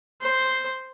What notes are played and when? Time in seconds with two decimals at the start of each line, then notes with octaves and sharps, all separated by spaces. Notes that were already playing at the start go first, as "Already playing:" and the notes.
0.21 C5